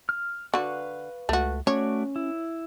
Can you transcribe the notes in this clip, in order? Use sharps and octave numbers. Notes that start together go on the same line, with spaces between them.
F6
D3 F#4 B4 F5 C#6
C#2 A3 F#4
A3 C#4 F#4 C#5 D5
E4